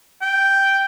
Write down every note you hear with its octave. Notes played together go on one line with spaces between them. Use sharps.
G5